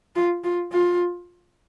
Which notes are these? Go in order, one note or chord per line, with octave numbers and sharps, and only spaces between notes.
F4
F4
F4